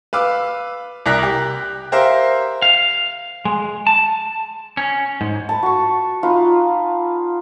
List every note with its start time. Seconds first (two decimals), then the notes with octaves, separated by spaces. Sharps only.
0.13 B4 F5 D6 E6
1.06 C2 E4 A#4 F#6 B6
1.23 G4
1.92 G4 A#4 C5 E5 F5
2.62 F5
3.45 G#3
3.87 A5
4.77 C#4
5.21 G#2
5.49 B4 A5
5.63 F#4 C#6
6.23 D#4 F4 B4